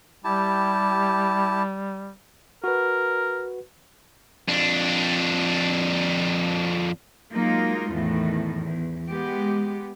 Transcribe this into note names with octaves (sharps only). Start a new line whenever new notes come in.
G3 E4 G4 A5
F#4 A#4 B4
F2 D4
F#3 G#3 A#3 D#4 F4
E2 A2 D#3 E3
E2
G#3 B3 G4